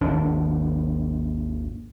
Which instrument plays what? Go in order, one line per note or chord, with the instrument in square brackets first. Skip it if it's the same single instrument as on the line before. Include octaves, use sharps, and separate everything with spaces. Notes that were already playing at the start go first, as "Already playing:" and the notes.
[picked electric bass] G#1 D#2 D4